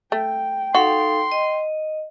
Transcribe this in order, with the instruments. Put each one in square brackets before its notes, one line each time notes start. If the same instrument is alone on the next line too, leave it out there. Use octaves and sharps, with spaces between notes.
[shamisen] A3 [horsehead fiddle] G5
[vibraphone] D#4 A4 F5 [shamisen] F#4 [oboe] C6
[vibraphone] D#5